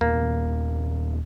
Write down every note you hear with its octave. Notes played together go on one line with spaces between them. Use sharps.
D#2 A#2 A#3 B3